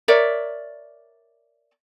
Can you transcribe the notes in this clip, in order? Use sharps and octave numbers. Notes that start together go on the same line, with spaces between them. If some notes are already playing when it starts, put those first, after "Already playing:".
A#4 C#5 D5 E5